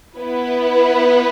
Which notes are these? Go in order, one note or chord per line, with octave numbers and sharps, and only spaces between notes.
B3 E4 B4